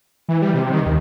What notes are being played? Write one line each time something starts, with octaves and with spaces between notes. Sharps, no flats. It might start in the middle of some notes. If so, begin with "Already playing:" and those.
E3
G3
C3
D#3
D#2